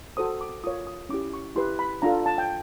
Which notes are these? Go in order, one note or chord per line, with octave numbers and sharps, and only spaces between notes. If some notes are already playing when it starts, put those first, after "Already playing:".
F#4 A4 C5 D#6
D6
F4 A#4 C#5 D#6
D#6
C#4 E4 G4 D6
C#6
E4 G4 B4 C6
B5
D4 F4 A4 A#5
A5
G5